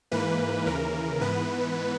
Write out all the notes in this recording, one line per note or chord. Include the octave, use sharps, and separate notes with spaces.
G#2 E3 A#3 B4
D#2 C#3 E3 A#4
G#2 E3 B3 B4